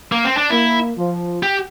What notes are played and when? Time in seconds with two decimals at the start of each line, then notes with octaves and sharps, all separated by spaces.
0.12 A#3
0.25 C4
0.37 D4
0.50 A#3 E4
0.97 F3
1.43 G4